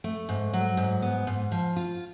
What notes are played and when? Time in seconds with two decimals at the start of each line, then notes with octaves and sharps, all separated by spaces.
0.04 A3
0.29 G#2
0.53 F#3
0.77 G#2
1.02 B3
1.27 G#2
1.52 F3
1.76 F4